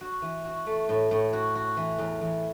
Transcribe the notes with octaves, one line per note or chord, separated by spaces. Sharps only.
F#4
E3
F#4
A3
A2
A2
F#4
F#4
E3
E2
E2